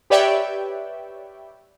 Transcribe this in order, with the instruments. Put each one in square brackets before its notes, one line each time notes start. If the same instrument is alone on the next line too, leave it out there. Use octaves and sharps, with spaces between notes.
[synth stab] G4 B4 C#5 D5 E5 G5